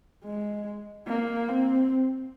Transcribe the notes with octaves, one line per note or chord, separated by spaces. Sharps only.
G#3
A#3
C4